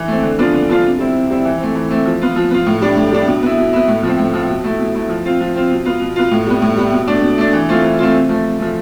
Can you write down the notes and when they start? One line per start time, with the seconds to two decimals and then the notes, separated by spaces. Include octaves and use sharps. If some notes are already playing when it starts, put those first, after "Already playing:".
Already playing: E3
0.08 A3 C4
0.23 D3
0.39 F3 B3 D4 F4
0.54 D3
0.69 F3 B3 D4 F4
0.84 C3
0.99 G3 C4 E4
1.14 C3
1.30 G3 C4 E4
1.45 E3
1.60 A3 C4
1.76 E3
1.91 A3 C4
2.06 F3
2.22 B3 F4
2.36 F3
2.51 B3 F4
2.66 A2
2.82 G3 D4
2.97 A2
3.12 G3 D4
3.27 B2
3.43 B3 E4
3.58 B2
3.73 B3 E4
3.88 A2
4.03 F3 C4
4.18 A2
4.34 F3 C4
4.49 B2
4.64 A3 E4
4.79 B2
4.95 A3 E4
5.09 F3
5.25 C4 F4
5.41 F3
5.55 C4 F4
5.71 B2
5.85 B3 F4
6.01 B2
6.16 B3 F4
6.31 A2
6.47 G3 B3
6.62 A2
6.77 G3 B3
6.93 B2
7.08 A3 D4
7.23 B2
7.38 A3 D4
7.53 E3
7.69 A3 C4 F4
7.84 E3
7.99 A3 C4 F4
8.14 C3
8.29 F3 A3
8.45 C3
8.59 F3 A3